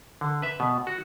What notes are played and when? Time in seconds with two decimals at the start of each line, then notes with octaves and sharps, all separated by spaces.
0.21 D3
0.42 B4 E5
0.60 B2
0.87 F#4